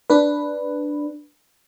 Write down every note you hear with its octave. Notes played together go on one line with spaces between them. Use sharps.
D4 B4